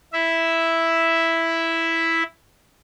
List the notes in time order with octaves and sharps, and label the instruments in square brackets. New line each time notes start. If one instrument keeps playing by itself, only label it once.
[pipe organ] E4 E5